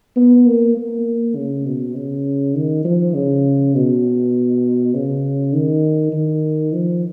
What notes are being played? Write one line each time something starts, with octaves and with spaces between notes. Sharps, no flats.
B3
A#3
A#3
C#3
B2
C#3
D#3
F3
C#3
B2
C#3
D#3
D#3
F3